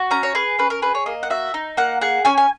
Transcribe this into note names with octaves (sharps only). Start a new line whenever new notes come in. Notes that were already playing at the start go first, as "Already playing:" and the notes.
Already playing: F#4
C#4 A#5
C#5
G#4 B4
C#4 B4
A#4
G#4 B4
C#5
A#3 D#5
F#5
F#4 E5
D#4
A#3 F#5
G#4 F#5
C#4 G#5
G#5